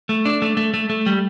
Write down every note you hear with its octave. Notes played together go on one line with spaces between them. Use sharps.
A3
D4
A3
A3
A3
A3
G3